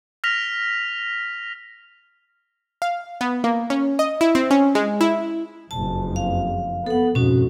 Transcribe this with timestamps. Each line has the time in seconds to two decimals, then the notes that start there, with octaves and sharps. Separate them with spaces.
0.24 F6 A#6 B6 F7
2.82 F5
3.21 B3
3.44 A#3
3.70 C#4
3.99 D#5
4.21 E4
4.35 C4
4.51 C#4
4.75 G#3
5.01 E4
5.71 F#1 F2 A5
6.16 F5
6.86 B3 A4 F#5
7.15 F2 G#2 B2 C#4 F#4